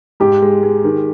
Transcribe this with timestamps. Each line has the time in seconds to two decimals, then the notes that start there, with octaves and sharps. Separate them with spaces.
0.20 G#2 G4
0.42 G#3
0.63 G#3
0.84 D#3